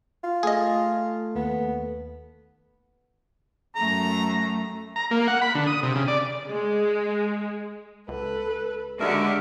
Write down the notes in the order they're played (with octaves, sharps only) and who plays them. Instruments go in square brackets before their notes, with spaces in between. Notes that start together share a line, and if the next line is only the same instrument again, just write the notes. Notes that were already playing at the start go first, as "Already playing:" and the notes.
[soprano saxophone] F4
[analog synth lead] A3 [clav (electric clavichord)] G#4 D#5
[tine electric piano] D#2 [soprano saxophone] B3
[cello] F#2 A3 [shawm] A#5
[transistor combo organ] A#5
A#3
F#5
B5
D3
D#6
C3
C#3
D5
[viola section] G#3
[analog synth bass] C#2 [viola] A4 B4
[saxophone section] D#2 A#4 E5 [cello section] D3 F#4 G4 [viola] G#3